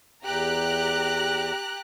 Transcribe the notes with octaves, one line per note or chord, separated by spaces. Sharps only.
E2 G4 A#5 F#6